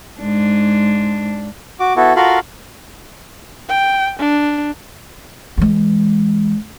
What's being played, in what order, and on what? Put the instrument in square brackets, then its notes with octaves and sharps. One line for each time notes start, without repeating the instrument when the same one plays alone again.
[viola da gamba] G#2 G#3 D4
[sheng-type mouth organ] F#4 D6
B3 E4 F#4 A4
F4 F#4 A4 A#4 F5 B5
[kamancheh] G5
D4
[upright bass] E3 G#3